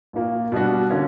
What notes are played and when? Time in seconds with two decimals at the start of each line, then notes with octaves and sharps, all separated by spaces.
0.13 A#1 A#2 A#3
0.52 B2 G3 B3 D4 F#4
0.90 D3 A#3 C#4